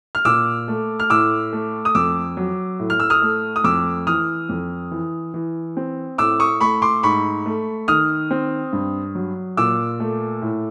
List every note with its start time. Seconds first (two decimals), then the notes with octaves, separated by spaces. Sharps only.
0.15 F6
0.25 A#2 D6 E6
0.68 A3
1.00 F6
1.10 A2 D6 E6
1.53 A3
1.85 D#6
1.95 F2 D6 E6
2.37 F#3
2.79 A2
2.90 F6
3.00 E6
3.10 D#6 F6
3.22 A3
3.56 D#6
3.64 F2 D6 E6
4.07 E3 D#6 F6
4.49 F2
4.91 E3
5.34 E3
5.77 C4
6.18 A2 D6 E6
6.40 C#6 D#6
6.61 A3 B5 C#6
6.82 C6 D6
7.03 G#2 B5 C#6
7.46 A3
7.88 D#3 D#6 F6
8.31 C4
8.73 G2
9.15 F#3
9.57 A#2 D6 E6
10.00 A3
10.42 A2